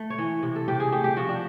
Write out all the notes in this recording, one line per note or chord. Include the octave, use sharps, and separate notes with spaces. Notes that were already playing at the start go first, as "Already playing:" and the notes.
Already playing: A3
C#5
E3
C3
A4
C3 G4
G#4
A3 G4
G4
F3 F#4
D4